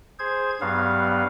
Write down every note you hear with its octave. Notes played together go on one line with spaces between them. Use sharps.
G#4 C5 G#6
G2 F#3 B3 F5